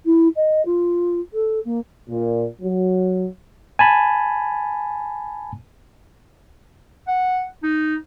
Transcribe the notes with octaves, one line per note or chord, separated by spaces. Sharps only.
E4
D#5
F4
A4
A#3
A#2
F#3
G#5 A5 B5
F#5
D#4